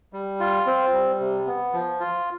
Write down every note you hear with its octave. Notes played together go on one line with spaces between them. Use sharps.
G3
F4
C4
G3
C3
B3
F3
F4